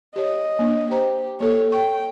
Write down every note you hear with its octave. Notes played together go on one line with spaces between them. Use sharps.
G4 C#5 D#5
A#3 D4
G4 C5 A#5
A#3 A4 C#5
G5 C#6